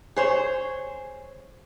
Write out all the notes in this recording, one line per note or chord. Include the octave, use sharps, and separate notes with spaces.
G#4 C5 C#5